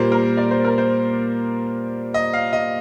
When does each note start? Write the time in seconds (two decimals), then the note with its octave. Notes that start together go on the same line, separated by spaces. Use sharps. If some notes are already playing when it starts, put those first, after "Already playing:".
Already playing: A#2 G3 A#3 C5
0.12 A#4
0.37 D5
0.51 C5
0.65 A#4
0.78 C5
2.14 D#5
2.33 F5
2.53 D#5